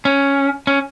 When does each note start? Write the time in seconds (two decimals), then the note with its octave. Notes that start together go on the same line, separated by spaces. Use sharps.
0.05 C#4
0.67 C#4